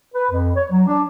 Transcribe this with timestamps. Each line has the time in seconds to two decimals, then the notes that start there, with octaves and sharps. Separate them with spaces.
0.15 B4
0.31 F2
0.56 C#5
0.70 F#3
0.87 D4